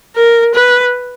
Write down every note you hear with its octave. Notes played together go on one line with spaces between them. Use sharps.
A#4
B4